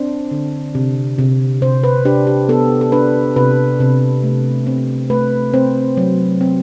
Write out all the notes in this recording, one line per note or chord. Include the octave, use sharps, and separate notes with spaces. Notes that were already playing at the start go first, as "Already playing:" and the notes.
Already playing: C4 D4 C5
D3
C3
C3
C3 C5
B4
D4 G4
G4
B3 A4
A4
D4 B4
C3 B4
C3
A3
C4
A3 B4
C4 C5
F#3
C4